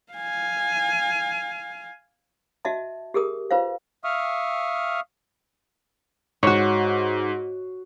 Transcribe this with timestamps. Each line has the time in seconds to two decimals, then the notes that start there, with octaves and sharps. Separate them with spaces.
0.12 F5 G#5
2.65 F#4 D#5 E5 A5
3.14 G4 G#4 A#4 D#6
3.51 F4 B4 C5 F5
4.04 E5 F5 C#6 D#6 F6
6.43 G#2 F#4 C#5